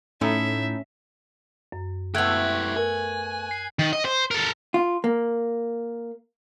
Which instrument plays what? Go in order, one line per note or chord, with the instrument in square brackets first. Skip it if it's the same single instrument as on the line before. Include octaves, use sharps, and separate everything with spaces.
[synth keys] A2 [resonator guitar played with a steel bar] A3 D#4 E4 [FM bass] C#4 [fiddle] E5
[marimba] F#2
[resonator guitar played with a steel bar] A3 B3 [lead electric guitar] E4 G4 [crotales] F#6 G#6 F#7
[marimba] A#4 [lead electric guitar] G#5
[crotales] C7
[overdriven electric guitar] D#3
D#5
C5
A4 A#4
[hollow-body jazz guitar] F4
A#3